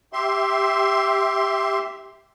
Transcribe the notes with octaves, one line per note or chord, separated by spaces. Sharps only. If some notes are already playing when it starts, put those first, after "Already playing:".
G4 E5 C6